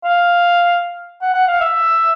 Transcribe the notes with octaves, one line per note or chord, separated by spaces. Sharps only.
F5
F#5
F#5
F5
E5